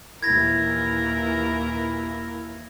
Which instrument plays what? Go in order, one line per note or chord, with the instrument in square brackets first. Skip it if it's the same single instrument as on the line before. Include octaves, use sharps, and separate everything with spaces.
[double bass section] D#2 A#2 E3 [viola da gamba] A#3 A#4 [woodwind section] E4 [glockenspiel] G#6 A#6